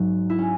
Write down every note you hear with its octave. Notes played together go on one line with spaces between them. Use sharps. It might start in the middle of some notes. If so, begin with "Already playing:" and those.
Already playing: G#2 F#3
E4
C#4